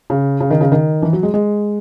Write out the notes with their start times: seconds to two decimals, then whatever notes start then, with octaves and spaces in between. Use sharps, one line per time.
0.10 C#3
0.40 C#3
0.51 D#3
0.61 C#3
0.72 D#3
1.02 E3
1.13 F#3
1.23 G#3
1.34 G#3